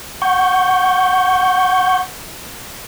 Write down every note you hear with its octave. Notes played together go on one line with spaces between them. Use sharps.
F#5 C#6 G6